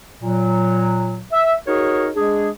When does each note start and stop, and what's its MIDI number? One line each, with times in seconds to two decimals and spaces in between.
0.22 1.20 46
0.22 1.20 54
1.31 1.54 76
1.66 2.08 63
1.66 2.08 66
1.66 2.08 68
1.66 2.08 70
1.66 2.08 73
2.15 2.48 56
2.15 2.48 62
2.15 2.48 68